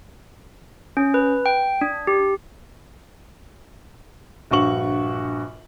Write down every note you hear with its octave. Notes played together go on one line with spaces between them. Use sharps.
C#4
B4
G5
D4
G4
A#1 G2 F#4 C#6 F#7